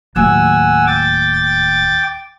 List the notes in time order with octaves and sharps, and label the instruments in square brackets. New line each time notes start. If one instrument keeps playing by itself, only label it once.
[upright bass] D1 D#2 [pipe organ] F#5 G#5 E6
[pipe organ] G5 D6 A6